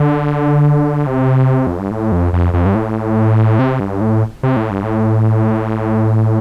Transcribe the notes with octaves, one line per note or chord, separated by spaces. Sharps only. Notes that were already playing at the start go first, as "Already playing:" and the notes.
Already playing: D3
C3
F2
G2
A2
F2
F2
F2
G2
A2
C3
G2
A2
C3
A2
G2
A2